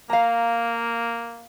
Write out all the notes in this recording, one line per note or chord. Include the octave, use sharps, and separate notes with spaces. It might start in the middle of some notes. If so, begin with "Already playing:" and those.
A#3 F5 A#5